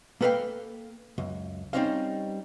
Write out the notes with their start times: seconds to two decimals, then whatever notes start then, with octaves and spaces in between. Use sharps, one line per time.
0.21 A#3 A4 B4 D#5 F5 G5
1.18 C#2 F#2
1.73 G3 C4 C#4 D#4 C5 F5